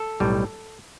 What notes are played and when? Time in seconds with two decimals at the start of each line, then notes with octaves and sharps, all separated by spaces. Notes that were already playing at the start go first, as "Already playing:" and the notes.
Already playing: A4
0.20 B1 A2 G3